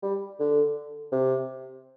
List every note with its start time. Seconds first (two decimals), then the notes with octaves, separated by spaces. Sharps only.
0.02 G3
0.40 D3
1.12 C3